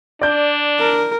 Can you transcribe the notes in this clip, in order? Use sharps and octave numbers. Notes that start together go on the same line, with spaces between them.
D4 D5 G6
A#4